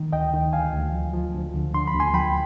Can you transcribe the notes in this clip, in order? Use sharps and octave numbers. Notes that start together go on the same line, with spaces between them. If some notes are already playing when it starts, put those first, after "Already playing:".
Already playing: D#3
D2 D#5 G5
D#3
D2 F5 G#5
D2
F3
F3
D2
D3
D3 C6
B5
D2
G#5 C6
F3 G5 B5